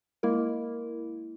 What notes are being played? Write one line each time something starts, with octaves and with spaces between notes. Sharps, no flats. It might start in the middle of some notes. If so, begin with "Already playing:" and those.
G#3 A#3 E4 A#4